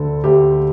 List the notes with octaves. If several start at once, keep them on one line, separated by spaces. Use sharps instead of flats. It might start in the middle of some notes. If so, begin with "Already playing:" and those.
Already playing: D2 D3 A4
D2 G4